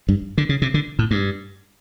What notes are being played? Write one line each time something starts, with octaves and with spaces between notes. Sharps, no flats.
G2
D3
C#3
C3
D3
A2
G2